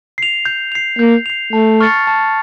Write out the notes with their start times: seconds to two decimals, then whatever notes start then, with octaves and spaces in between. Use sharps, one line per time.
0.18 C7 F7
0.45 G6
0.72 C7 F7
0.99 A#3 G6
1.26 C7 F7
1.53 A3 A5
1.80 C#6 F6 A6 C#7
2.07 A5